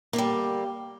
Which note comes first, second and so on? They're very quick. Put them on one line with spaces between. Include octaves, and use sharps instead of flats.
A#3 D3 G3